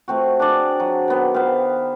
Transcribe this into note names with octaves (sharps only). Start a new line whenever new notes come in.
A3 C4 F#4
D4 G#4 D5
F#3
D#3 B3
B3 C5 F5